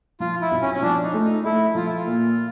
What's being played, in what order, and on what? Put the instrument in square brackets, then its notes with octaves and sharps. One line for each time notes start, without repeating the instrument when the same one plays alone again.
[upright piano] F3 [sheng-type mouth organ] F4
[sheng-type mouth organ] E4
[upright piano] B1
[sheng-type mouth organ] C#4
C#4
[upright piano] F3 [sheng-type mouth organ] D4
[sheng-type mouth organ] D#4
[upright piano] A3
[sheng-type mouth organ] D#4
[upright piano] A3 [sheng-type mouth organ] E4
[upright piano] F3 [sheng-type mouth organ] F4
[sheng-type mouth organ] E4
F4
[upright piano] A#2